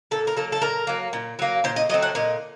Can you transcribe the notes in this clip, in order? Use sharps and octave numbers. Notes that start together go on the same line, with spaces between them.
A#2 A4
A#4
F#3 A#3 A4
A4
A#2 A#4
F#3 A#3
A#2
F#3 A#3
A#2 C5
D#5
F#3 A3 C4 D#5
F#5
A#2 D#5